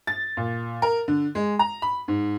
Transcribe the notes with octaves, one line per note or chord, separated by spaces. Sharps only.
A6
A#2
A#4
D3
G#3
A#5
B5
G#2